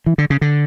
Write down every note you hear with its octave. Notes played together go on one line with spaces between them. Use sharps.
E3
D3
C#3
D3